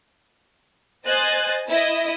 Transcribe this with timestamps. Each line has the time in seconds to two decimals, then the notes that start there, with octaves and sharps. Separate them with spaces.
1.06 C5 D#5 G#5 F#6 A6
1.68 E4 D#5